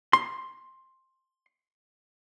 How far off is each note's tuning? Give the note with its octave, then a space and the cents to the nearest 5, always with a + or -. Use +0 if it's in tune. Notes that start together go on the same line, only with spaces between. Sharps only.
C6 +10